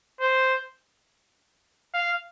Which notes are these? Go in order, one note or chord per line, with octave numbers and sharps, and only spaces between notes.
C5
F5